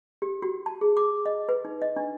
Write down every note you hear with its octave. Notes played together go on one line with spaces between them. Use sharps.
G4
F#4
A5
G#4
D6
D#5
B4
D#4
D#5
D4